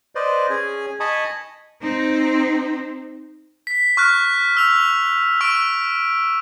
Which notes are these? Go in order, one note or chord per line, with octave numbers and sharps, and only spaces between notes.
B4 C5 D5 D#5
C#4 G#4 G#5
D#5 G#5 A5 B5 C#6 D#6
C4 D#4
B6
C#6 F6 F#6
E6 F7
C#6 E6 D7